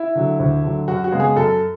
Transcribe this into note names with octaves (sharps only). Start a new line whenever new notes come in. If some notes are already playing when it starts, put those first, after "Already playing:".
Already playing: E4
D3 F#3
D2
D3 F#3
F#2 F#4
F#4
C#3 G#3 B3
G#4
F#2 A4